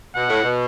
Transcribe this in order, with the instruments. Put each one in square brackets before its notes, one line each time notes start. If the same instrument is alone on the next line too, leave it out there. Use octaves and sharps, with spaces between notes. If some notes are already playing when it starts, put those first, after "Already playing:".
[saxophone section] B2 [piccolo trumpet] F#5
[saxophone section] A2
B2